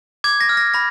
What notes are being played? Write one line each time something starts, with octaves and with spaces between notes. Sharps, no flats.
D6 G#6
A#6
F6
A#6
B5 A#6